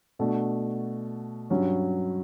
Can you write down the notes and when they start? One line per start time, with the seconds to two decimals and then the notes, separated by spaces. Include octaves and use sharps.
0.19 B2 A3 D4 F#4
1.50 G2 F#3 C#4